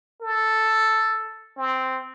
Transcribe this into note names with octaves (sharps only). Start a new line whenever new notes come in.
A4
C4